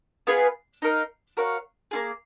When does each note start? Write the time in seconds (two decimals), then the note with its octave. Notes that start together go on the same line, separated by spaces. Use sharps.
0.27 B3 F4 G#4 B4
0.82 D#4 A#4 F5
1.37 F#4 A#4 C#5 F5
1.91 A#3 F4 G#4